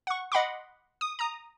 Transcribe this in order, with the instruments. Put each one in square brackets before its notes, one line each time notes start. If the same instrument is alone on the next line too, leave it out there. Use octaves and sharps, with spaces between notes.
[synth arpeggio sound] F#5 C#6
D#5 F#5 B5 C6 D6
D#6
A#5 D#6